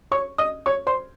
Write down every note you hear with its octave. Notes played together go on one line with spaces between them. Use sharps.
C#5 C#6
D#5 D#6
C#5 C#6
C5 C6